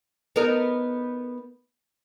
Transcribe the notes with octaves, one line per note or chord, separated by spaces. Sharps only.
B3 D#4 A#4